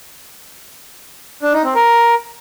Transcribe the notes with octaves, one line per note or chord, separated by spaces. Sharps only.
D4
D#4
C4
A#4